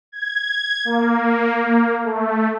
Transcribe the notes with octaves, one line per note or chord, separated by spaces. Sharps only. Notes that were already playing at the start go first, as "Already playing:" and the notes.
G#6
A#3
A3